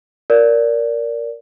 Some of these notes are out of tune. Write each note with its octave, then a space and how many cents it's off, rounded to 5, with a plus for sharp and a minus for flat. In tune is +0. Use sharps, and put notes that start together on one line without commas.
A#4 +0 D5 -15